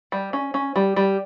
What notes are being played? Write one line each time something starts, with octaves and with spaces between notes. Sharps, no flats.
G3
C#4
C#4
G3
G3